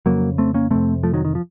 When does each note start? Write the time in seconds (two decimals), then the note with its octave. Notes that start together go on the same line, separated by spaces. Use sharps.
0.06 F2 C#3 F#3 A#3
0.38 A3 C4
0.54 A#3 C#4
0.70 F2 C3 A3 C4
1.03 F3 A3
1.14 D#3 F#3
1.25 D#3
1.35 F3